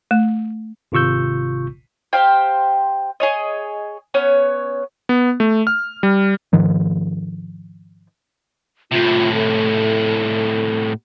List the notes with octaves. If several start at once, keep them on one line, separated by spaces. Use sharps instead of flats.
A3
G#1 C3 F4 C#6 E6 G6
G4 C5 F5 G5
G#4 C#5 D#5
B3 C#4 C#5
B3
A3
F6
G3
G#2 D#3 F3
A2 C3 F4
A4